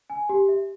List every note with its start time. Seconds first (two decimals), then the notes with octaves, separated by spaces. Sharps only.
0.10 G#5
0.29 G4
0.48 E5